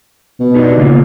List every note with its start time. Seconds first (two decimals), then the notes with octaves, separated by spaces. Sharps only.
0.40 B2
0.54 D4 D#4 G4
0.77 C#3 A#3 F4